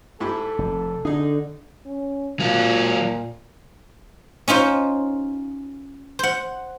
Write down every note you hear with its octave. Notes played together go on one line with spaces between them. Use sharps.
G#2 E4 G4 A4
F1
D3 D4 D#4 G#4
C#4
A#2 F#3 F4
C#4 D#4 F4 C5
C5 F#5